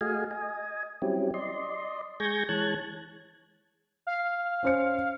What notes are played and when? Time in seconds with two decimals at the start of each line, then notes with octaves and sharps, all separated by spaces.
0.01 A3 F#4 G#4 D#5 F5 G#5
0.31 D#5 G#5
1.02 F#3 G3 C4 C#4 E4 G4
1.34 D5 D#5 C6
2.20 G#3 G#4 C#6 G6 G#6 A#6
2.49 E3 G#3 C#5 A5 F#6 G#6
4.07 F5
4.63 C#4 C5 C#7